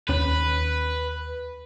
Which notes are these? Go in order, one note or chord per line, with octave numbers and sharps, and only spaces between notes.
D#2 C#4 B4